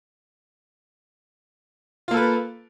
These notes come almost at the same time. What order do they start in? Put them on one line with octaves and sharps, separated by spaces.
F4 A#3 A4 B4